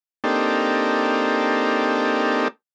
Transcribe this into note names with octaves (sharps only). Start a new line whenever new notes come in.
A#3 C4 D4 D#4 G4 A4